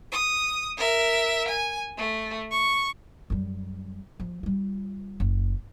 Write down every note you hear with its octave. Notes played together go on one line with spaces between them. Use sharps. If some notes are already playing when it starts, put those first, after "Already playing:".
D#6
A#4 E5
G#5
A3
C#6
F#2 G3
F3
G3 F4
F#1